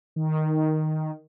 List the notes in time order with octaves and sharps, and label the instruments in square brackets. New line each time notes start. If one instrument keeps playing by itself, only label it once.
[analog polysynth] D#3